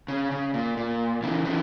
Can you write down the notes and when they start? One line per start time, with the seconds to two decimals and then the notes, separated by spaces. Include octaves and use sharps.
0.08 C#3
0.31 C#3
0.54 A#2
0.77 A#2
1.23 C#3 E3
1.45 C#3 E3